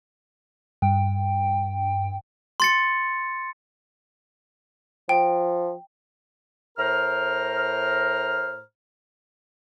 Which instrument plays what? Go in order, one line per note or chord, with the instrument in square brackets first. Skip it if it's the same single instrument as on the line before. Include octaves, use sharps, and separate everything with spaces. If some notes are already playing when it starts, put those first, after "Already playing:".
[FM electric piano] G2 [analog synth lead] G5
[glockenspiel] C6 A6 C#7
[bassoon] F3 [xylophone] G5
[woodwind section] A2 A#4 C5 A#5 F6